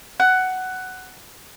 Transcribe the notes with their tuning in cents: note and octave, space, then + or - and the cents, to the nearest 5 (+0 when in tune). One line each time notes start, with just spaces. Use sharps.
F#5 +10